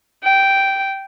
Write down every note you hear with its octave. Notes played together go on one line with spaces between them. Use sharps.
G5